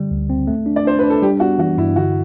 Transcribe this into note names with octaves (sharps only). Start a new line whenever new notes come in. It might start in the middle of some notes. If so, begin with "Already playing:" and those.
Already playing: D3 G3
D2
C4
A3
D4
D5
D4 C5
D4 B4
A4
G3 G4
B3 F#4
E3 F#4
G2 E4
D3 F#4